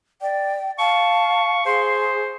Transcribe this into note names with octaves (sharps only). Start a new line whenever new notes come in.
D5 G5
F5 A5 C#6
G#4 C5 C6